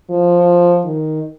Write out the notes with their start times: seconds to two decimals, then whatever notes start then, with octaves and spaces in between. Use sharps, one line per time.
0.10 F3
0.86 D#3